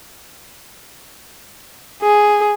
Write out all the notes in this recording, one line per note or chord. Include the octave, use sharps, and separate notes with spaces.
G#4